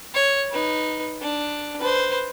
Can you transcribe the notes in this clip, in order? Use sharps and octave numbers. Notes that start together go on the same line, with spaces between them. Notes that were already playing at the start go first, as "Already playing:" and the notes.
C#5
D#4 B4
D4
B4 C5